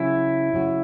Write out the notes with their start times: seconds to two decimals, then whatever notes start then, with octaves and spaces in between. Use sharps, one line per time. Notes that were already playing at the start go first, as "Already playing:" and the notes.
Already playing: C#3 F#3 C#4 E4 F#4
0.54 C#3 F#3 C#4 F#4